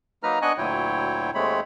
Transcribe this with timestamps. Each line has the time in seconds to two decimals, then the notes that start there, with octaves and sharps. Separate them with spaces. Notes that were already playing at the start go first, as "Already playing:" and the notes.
0.23 F#3 A#3 D#4 B4 A#5 F6
0.42 B3 D4 D#5 G#5 C#6 F#6
0.58 D2 A#2 F#3 E4 C#5 G5
1.35 D#2 G#3 A3 C4 C#5 B5